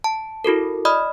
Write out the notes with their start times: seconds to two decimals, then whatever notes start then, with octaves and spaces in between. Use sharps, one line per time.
0.04 A5
0.44 E4 F#4 A4 A#4
0.85 D5 D#5 B5 D#6 F6